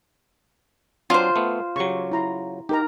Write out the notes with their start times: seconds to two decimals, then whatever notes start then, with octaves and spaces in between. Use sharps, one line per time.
1.10 F#3 C4 D4 F4 C5
1.36 A3 B3
1.76 C#3 F#3 G4 C#6
2.12 E4 A#5 C6
2.69 D#4 G4 A#4 A#5